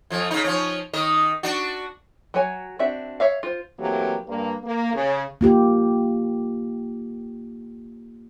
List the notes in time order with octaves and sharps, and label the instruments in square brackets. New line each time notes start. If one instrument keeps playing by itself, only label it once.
[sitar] F2 F3
C#3 D#4
F3 C#4
D#3 D#5
D4 F#4
[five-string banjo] F#3 F#4 C#5 G#5
C4 D4 F#4 E5
C#5 E5 F5
F4 C5
[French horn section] C3 E3 F#3 A3 A#3 G4
G2 A#3
A#3
C#3
[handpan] A#3 F4 G4